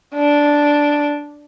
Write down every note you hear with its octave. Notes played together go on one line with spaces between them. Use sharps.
D4